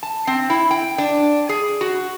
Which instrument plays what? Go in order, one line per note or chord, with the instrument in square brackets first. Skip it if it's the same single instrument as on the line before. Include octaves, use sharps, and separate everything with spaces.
[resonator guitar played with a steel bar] A5
C4
E4
G5
D4
G#4
F#4